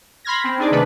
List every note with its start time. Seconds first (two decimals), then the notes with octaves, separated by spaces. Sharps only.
0.25 B5 C6 F6 G#6 A#6
0.44 C4
0.58 D4 D#4 G#4 D5
0.71 C3 D#3 A3 D4 B4